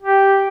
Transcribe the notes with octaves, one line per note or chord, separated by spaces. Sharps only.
G4